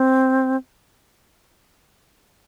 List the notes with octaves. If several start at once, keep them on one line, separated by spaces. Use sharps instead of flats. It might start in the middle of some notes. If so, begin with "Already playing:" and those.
Already playing: C4